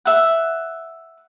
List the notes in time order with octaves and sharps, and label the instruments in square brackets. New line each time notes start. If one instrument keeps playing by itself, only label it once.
[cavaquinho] E5 F#5